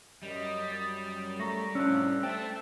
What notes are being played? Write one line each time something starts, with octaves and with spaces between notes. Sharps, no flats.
F#2 G3 D#5
F#2 D#6 A6
A3 A#5 C#6 A#6
A2 C3 F3 C#4 D4 E6 F#6
A3 C5 E5 G5 A5